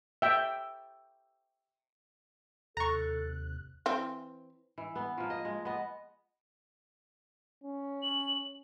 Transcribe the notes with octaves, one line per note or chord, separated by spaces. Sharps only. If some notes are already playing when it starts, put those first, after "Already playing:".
E5 G5
D#2 C3 A4 A#5 C#6 F#6
E3 C4
E3
B3
F3 A#3
D#5
G#3
B3 D#5
C#4
F#7